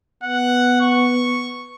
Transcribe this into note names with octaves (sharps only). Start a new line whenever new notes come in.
B3 F#5
C#6